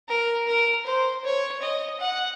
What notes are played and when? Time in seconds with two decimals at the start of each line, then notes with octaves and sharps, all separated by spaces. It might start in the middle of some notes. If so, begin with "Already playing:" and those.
0.09 A#4
0.47 A#4
0.86 C5
1.24 C#5
1.62 D#5
2.01 F#5